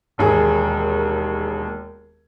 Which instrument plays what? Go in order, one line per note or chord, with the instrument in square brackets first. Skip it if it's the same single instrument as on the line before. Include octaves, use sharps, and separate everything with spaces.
[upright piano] E1 D#2 G#4